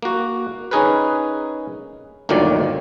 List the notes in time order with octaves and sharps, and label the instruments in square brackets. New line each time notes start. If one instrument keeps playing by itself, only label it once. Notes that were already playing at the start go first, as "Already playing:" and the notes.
[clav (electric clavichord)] A#3 F#4
C#4 D#4 G#4 A#4 B4
G1 D2 A#2 D#3 F#3 D5